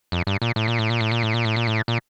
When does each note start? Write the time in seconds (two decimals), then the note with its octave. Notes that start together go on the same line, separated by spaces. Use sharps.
0.12 F2
0.27 G2
0.42 A#2
0.56 A2
0.68 A#2
0.79 A2
0.90 A#2
1.01 A2
1.12 A#2
1.23 A2
1.34 A#2
1.45 A2
1.56 A#2
1.67 A2
1.88 A#2